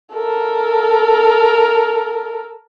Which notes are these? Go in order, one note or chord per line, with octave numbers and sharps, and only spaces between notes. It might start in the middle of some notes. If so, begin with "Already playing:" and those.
A4 A#4